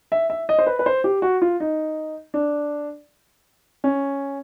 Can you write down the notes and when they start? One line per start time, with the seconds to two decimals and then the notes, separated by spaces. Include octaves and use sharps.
0.12 E5
0.30 E5
0.49 D#5
0.59 C5
0.66 B4
0.79 B4
0.86 C5
1.04 G4
1.22 F#4
1.42 F4
1.60 D#4
2.34 D4
3.84 C#4